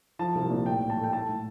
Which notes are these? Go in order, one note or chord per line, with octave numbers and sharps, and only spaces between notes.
F3 A5
C2
A#2
A2 G5
A2
A5
A3
G5
A2 A5
A2